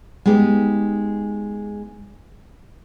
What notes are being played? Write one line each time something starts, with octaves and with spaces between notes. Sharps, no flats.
G#3 B3 D#4 G4